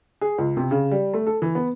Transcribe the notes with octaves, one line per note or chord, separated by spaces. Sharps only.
G#4
C#2
C3
C#3
G3
A3
A4
E3
B3